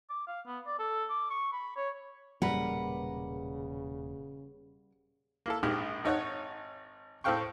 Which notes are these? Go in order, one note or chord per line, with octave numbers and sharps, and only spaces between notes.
D6
F5
B3
D5
A4
D6
C#6
B5
C#5
E1 A#2 C#3 G3 A#3 A#4 B4 F#5
A#3 E4 A4
A#1 G#2 G#3 G4 F6
G#1 D#4 C#5 F#5
A2 C4 A4 F5 G5 C#6